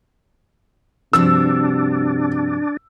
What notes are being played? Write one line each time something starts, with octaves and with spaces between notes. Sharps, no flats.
G2 C3 F3 D4 F#4 E6